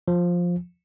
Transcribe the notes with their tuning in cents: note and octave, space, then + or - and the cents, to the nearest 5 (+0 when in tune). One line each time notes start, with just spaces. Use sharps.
F3 +10